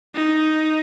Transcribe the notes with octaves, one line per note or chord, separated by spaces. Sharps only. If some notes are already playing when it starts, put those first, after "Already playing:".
D#4